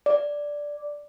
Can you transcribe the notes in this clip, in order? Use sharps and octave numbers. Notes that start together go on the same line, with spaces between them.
D5